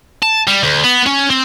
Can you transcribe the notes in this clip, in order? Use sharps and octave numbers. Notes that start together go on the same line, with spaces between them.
A5
G3
D2
B3
C#4
C4